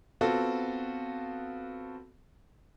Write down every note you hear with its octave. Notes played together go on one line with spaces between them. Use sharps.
B3 C4 F4 F#4 A4